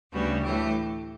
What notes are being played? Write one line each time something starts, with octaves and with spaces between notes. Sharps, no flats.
D2 C#3 G3 B3 F#4
A2 E3 A3 G4